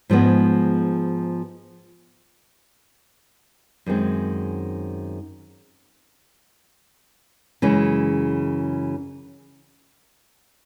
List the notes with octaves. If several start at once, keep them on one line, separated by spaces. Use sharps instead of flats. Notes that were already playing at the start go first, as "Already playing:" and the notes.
G#2 F3 G#3 B3
F#2 D#3 G#3 C4
F#2 C#3 E3 G#3 C#4